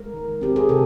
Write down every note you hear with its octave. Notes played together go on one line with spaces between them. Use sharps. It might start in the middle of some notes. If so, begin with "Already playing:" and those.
Already playing: G#3 A#4
D#3
C4 G4
G#4
C3 A4